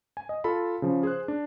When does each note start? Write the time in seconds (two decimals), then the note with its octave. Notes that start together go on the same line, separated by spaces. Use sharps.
0.17 G#5
0.29 D#5
0.44 F4 A4 A5 B5
0.82 C#3 F3
1.03 G#4 C5 F#6
1.28 D4